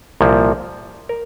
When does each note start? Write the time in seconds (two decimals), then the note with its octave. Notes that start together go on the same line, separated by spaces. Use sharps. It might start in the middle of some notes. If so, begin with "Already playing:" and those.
0.21 C2 A#2 F3
1.09 A#4